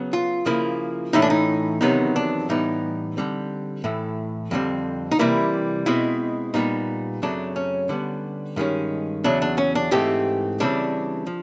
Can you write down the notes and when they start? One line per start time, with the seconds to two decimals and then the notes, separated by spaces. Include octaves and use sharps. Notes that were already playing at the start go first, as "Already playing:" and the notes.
Already playing: C#3 F#3 B3
0.13 F4
0.46 C#3 F3 A#3 E4
1.13 A2 E3 A3 C#4 D#4
1.22 D4
1.30 D#4
1.81 E2 C3 D#3 F#3 B3 D#4
2.16 D4
2.49 A2 E3 G3 B3 D#4
3.17 D3 G3 C4
3.84 A2 E3 A3
4.51 F2 D3 G3 C4
5.11 D#4
5.19 C3 E3 G3 A#3 E4
5.86 B2 G#3 C4 E4
6.54 A#2 G3 B3 D#4
7.22 F#2 C#3 F#3 A3 C4 D4
7.56 C#4
7.89 D3 G3 B3
8.56 G2 D#3 G#3 C#4
9.24 E2 C#3 F#3 D4
9.42 D4
9.58 C#4
9.75 D4
9.91 G#2 E3 A3 C4 G4
10.60 C#3 E3 G3 C4 D4
11.27 F3